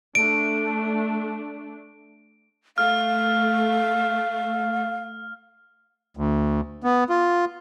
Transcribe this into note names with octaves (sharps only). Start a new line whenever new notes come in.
A3 D4 D7
A3 F5 F6
D2
B3
F4